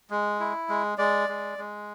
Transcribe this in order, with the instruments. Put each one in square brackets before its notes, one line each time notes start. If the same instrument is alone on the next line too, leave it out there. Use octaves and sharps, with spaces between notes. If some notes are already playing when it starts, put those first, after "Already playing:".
[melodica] G#3
E4
G#3
G#3 D5
G#3
G#3